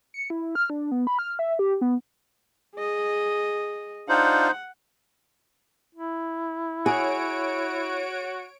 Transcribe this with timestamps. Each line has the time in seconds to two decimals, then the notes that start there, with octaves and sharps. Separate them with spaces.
0.14 C#7
0.30 E4
0.55 F6
0.70 D4
0.91 B3
1.07 B5
1.19 F6
1.39 E5
1.59 G4
1.81 B3
2.76 G#4 D#5
4.09 D4 D#4 F4 C5 F5 F#5
5.95 E4
6.86 F#4 G#4 C#5 D7